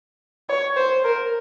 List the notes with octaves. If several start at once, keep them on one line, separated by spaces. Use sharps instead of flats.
C#5
C5
A#4